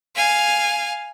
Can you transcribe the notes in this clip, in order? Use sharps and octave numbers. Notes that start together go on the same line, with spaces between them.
F5 G#5